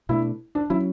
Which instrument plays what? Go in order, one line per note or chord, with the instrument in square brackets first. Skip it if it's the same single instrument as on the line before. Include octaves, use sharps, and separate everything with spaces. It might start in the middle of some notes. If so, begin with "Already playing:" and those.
[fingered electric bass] B2 A3 D4 [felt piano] E4
[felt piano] D4
[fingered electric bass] F#3 C#4 [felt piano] E4